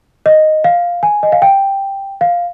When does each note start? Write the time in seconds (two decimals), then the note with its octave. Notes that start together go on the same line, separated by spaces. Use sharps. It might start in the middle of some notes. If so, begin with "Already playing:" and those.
0.26 D#5
0.64 F5
1.03 G#5
1.23 D#5
1.32 F5
1.42 G5
2.21 F5